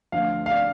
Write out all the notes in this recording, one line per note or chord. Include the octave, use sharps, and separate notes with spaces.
D2 D3 F3 F5
F5
D5